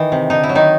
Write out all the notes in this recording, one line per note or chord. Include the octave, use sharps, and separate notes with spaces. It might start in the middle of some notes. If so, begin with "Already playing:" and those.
Already playing: D#3 E3 D#4
C3
D3 D#4
E4
F#3
D#3 D#4